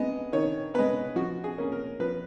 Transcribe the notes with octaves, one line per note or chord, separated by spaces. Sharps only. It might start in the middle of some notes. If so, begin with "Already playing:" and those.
Already playing: G#3 B3 D#5
D#3 C#5
G#3 B3 B4
F3 F#4
G#4
A#3 C#4
A#4
F3 B4